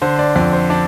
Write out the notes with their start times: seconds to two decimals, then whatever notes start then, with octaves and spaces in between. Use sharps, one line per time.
0.02 D3 C5
0.19 D5
0.36 F2 D5
0.53 C5
0.70 D4 D5